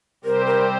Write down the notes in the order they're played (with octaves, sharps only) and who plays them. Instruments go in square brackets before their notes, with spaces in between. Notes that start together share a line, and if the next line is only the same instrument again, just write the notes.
[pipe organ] C3 G3 C4 G4 C5 [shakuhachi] A#4
[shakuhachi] A#4